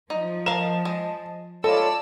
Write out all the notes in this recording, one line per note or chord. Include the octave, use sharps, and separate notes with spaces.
F3 D#4
A#4 D#5 F5 A5 E7
G#3
G#3 F4 A4 C#5 D5 A5 B5 E6